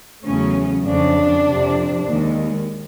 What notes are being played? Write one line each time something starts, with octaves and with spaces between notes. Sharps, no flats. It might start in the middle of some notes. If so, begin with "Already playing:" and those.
E2 C#3 F#3 A3 C#4
F2 C#3 F3 D4
F2 C3 F3
D#2 D#3 G#3